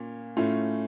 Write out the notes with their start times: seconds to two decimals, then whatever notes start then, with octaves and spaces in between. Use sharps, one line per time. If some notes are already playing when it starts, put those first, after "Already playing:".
Already playing: A#2 A#3 C#4
0.37 A2 A3 C#4 F4